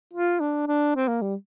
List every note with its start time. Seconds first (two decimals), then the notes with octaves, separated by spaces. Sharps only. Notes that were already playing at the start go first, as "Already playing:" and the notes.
0.13 F4
0.40 D4
0.67 D4
0.96 C4
1.08 A#3
1.22 G3